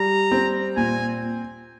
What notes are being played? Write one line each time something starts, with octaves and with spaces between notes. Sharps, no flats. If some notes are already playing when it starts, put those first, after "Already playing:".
Already playing: G3 A#5
C4
A#2 G#5